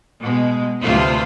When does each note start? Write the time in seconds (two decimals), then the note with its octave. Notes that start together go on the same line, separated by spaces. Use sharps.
0.21 B2 G#3
0.82 D2 C3 A3 F4 B4 C5